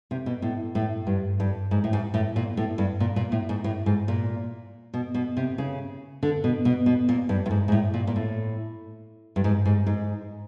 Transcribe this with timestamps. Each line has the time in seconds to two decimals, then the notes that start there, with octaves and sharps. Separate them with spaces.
0.11 C3
0.26 B2
0.42 A2
0.75 A2
1.07 G2
1.40 G2
1.71 G#2
1.84 A2
1.93 G#2
2.14 A2
2.36 A#2
2.57 A2
2.78 G2
3.00 A#2
3.16 A#2
3.32 A2
3.49 G#2
3.64 A2
3.86 G#2
4.08 A#2
4.94 B2
5.14 B2
5.37 C3
5.58 C#3
6.23 D3
6.44 B2
6.65 B2
6.86 B2
7.09 A#2
7.29 G2
7.46 G2
7.51 G#2
7.68 G#2
7.72 A2
7.94 A#2
8.07 A#2
8.16 A2
9.36 G2
9.44 G#2
9.65 G#2
9.86 G#2